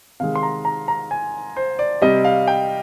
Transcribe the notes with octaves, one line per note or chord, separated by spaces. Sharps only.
C3 D#3 G#3 F5
C6
A#5
A#5
A#5
G#5
C5
D5
C3 G3 D#5
F5
G5